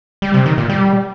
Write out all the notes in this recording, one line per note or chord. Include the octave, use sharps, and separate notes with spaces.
G3
C3
D#3
A#2
G3